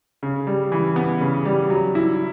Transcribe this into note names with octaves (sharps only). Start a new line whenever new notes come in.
C#3
G3
E3
B3
C#3
G3
F#3
E4